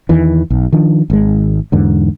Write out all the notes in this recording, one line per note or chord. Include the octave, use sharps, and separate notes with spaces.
E2 D#3 E3
B1
D#3 F3 D4
G#1 G#3
E2 G#2 D3